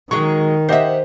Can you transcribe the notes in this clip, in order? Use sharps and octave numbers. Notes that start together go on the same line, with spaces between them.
D#3 F#3 G#3 C#6
G4 C5 D#5 E5 F#5